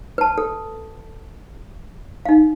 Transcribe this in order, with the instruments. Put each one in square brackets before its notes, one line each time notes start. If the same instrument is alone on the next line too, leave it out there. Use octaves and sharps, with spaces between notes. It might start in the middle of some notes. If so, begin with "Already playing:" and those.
[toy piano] B4 A5
A4
D#4 F5